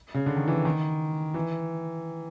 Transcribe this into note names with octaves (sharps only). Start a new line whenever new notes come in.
C#3
D3
D#3
E3
D#3
E3